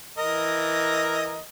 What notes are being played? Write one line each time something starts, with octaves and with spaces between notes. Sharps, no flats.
E3 A#4 D#5